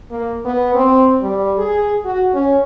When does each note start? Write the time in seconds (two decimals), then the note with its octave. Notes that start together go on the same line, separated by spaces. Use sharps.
0.11 A#3
0.45 B3
0.75 C4
1.22 G3
1.58 G#4
2.05 F#4
2.34 C#4